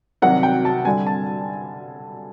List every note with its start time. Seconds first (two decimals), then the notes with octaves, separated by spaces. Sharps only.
0.22 C2 C3 D#3 F#3 F#5
0.43 G5
0.65 A5
0.85 G2 D3 G3 G#5
1.07 A5